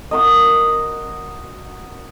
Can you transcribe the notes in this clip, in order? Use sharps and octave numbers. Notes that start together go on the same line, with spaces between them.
F#4 A#4 D#5